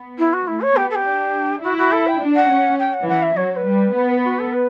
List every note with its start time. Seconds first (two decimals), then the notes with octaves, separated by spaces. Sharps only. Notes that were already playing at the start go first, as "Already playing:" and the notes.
Already playing: B3
0.18 E4
0.33 F#4
0.47 A3 E4
0.61 C#5
0.76 B3 G4
0.90 A4
0.95 G4
1.05 D4
1.63 E4 F#4
1.77 F#4
1.92 A4
2.07 G5
2.21 D4
2.35 F#5
2.51 C#4
2.79 G5
2.93 F#5
3.07 E3 F#5
3.22 E5
3.36 F#3 C#5
3.52 C#5
3.56 B4
3.66 G3
3.94 B3
4.24 F#4
4.39 A4
4.52 B4